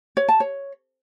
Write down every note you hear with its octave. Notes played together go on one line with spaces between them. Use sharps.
C#5
A5
C#5